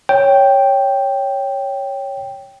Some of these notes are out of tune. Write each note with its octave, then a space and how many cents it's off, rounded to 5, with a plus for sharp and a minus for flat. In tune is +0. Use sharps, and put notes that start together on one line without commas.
C#5 +0 G5 +0